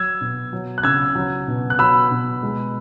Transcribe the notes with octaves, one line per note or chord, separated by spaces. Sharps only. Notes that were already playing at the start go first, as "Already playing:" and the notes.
Already playing: F#3 E6 G#6
B2
F#3
F#6
C#3 E6 G#6
F#3
B2
F#6
F#3 B5 E6
B2
G#3